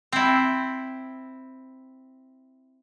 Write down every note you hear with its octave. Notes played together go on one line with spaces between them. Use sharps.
C4 E4